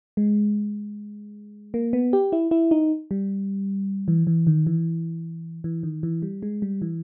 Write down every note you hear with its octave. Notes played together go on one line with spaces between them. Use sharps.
G#3
A#3
B3
G4
E4
E4
D#4
G3
E3
E3
D#3
E3
E3
D#3
E3
G3
G#3
G3
E3